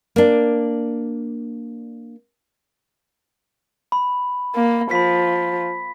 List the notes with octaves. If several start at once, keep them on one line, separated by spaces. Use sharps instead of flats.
A#3 D4
B5
A#3
F3 B5 B6